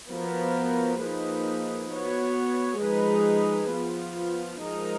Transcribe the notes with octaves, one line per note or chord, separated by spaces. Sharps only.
F3 B3 F#4 A#4
F3 A#3 D#4 G#4 B4
B3 F#4 C#5
F3 G#3 D#4 G#4 B4
F3 B3 F4
F3 G#3 D#4 A#4